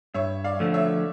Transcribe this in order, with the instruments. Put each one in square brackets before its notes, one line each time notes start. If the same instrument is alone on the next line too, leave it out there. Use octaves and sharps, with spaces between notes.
[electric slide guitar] G2 [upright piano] C#5 E5
[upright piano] D5 F5
[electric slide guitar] D3 F3 A3
[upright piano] C#5 E5